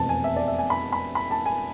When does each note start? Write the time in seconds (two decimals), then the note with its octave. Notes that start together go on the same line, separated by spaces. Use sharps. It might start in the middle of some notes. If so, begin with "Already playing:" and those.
Already playing: F1 E2 B2 G#3 C4 A5
0.09 G#5
0.24 E5
0.36 D5
0.48 E5
0.58 G#5
0.70 B5
0.93 B5
1.15 B5
1.31 A5
1.46 G#5